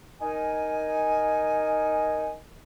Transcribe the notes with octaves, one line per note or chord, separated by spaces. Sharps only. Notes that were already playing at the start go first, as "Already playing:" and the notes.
D#4 A#4 G#5